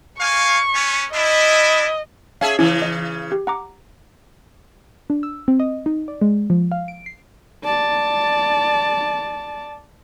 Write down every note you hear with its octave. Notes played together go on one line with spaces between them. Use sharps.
A#3 F5 G#5 C#6
B3 C#4
D4 E4 D#5
C#4 G#4 E5 F5 A5
C#3 E3 C#4 E4
D#5
G4
F#5 A#5 D6
D4
E6
C4
D#5
D#4
D5
G#3
F3
F5
D7
C7
D5 A5